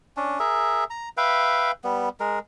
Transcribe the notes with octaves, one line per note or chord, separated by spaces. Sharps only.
C#4 D4
G#4 A#4 E5
A#5
B4 E5 F5 G5
G3 B3
G#3 A#4